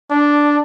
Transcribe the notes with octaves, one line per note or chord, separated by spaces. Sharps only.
D4